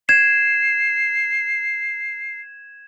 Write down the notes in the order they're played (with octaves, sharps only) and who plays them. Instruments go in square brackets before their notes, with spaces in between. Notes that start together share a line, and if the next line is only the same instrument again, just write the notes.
[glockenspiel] G#6 E7 [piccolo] C7